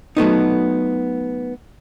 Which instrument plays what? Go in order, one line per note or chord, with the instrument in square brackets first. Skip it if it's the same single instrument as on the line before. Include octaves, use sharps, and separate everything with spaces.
[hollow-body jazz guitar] F#3 A3 B3 D#4